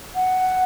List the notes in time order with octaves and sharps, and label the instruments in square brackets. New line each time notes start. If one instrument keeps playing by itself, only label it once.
[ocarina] F#5